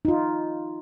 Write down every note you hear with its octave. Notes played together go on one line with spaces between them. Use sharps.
D#4 F4